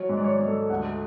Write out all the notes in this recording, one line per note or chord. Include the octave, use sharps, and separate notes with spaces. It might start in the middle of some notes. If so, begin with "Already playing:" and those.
Already playing: F#3 C#5
G#2
D5
C#5
G#2
A4
D2 F#5